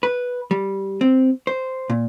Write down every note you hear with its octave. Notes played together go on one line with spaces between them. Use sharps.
B4
G3
C4
C5
A#2